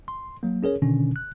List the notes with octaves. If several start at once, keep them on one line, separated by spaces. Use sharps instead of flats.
C6
F#3 A#3
C#4 G#4 A#4 C#5
B2 D3 D#3 C#4 D4
F#6